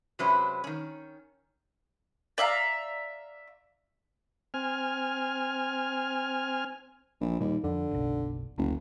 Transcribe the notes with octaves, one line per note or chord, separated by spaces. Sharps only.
C3 F#3 G#3 C#4 B4 C5
D#3 C#4
D5 E5 F5 A#5
C4 G#5 F6
A#1
D#2 A#2 G3
F2 D3
F#1 B1
F#1 D2